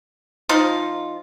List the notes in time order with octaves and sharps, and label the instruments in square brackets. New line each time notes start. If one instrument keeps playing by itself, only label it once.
[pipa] F3 D#4 F4